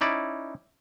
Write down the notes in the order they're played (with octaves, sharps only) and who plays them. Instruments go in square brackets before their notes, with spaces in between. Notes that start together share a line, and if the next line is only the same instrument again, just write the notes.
[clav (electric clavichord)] C#4 D#4 E4 D5